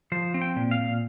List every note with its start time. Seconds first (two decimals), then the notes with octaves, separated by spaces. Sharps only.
0.12 F3 C5
0.34 C4
0.41 G5
0.56 A#2
0.71 F5
0.79 A#2